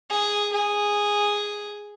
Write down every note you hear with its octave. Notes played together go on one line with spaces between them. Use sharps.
G#4
G#4